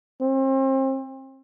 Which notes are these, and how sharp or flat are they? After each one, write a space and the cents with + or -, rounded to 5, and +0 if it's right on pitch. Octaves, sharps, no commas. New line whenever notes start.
C4 +35